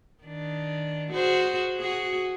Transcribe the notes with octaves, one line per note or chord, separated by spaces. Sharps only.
D#3 D4
F#4 G#4 C5
F#4 G#4